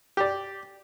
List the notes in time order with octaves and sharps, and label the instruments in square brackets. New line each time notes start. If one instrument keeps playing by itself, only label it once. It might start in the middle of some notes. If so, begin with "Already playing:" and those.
[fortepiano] G4 D5